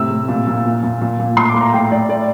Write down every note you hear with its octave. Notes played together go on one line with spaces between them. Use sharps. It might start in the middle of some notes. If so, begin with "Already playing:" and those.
Already playing: A2 C3 E6
A2
A#2
A#2
A#2
A#2
A#2
A#2
A2 C6
D6
A2
A#5
A2 G5
A2 D5
A2 D5